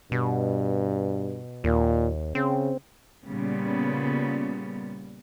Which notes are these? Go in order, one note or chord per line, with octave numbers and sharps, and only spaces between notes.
G2 B2
D#2 A#2
C#3 C4
A#2 C#3 G3 B3